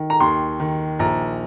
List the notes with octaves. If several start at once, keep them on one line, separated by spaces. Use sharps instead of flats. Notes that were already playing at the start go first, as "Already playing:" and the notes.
Already playing: D#3
A#5
D#2 C6
D#3
A#1 A#5